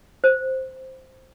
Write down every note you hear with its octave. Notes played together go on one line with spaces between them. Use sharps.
C5